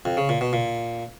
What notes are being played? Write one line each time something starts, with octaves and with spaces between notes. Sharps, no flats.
F2
C#3
A#2
B2
A#2